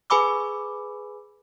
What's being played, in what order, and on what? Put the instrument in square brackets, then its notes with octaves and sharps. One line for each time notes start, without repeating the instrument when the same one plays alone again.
[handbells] G#4 B4 G#5 B5 D6 E6